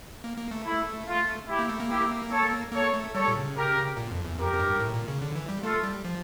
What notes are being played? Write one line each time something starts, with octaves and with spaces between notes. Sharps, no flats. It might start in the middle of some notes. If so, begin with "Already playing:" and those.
A#3
A#3
A3
E4
F4
E4 G4
A#3
A3
A#3
E4 G4
A4 C#5
A#3 A4 C#5
A3
G3 A4 C#5
A#2
C#3
G4 A#4
A#2
F2
E2
F2 G4 A#4
F2
G2
A2
A#2
C#3
D3
E3
G3
A3 F4 A4
G3
F3